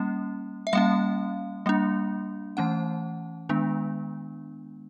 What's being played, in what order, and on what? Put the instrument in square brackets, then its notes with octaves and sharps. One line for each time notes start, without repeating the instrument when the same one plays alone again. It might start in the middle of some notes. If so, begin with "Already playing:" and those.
Already playing: [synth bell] G3 A#3 C#4
E5
G3 A#3 C#4 F5
G3 A#3 D4
E3 A3 C#4 F#5
D#3 G#3 B3 D4